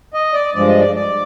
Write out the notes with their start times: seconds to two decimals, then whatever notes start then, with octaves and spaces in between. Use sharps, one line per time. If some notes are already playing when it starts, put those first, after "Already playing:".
0.14 D#5
0.33 D5
0.54 G2 F3 G#3 D5
0.67 D#5
0.80 D5
0.95 D5